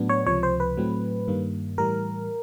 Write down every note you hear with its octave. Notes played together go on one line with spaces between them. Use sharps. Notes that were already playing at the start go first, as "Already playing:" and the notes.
Already playing: A2 F#3 B3 D4
C#5
C#2 C3 F3 C#5
C5
B4
A2 F#3 A3 C4
G2 D#3 G3 A#3
A2 E3 G3 A#4